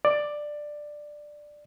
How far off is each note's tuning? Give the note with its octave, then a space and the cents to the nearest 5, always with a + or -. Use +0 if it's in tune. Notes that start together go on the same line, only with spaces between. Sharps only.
D5 +10